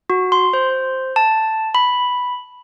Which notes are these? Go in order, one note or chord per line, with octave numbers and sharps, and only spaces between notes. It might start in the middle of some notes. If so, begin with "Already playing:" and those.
F#4
C6
C5
A5
B5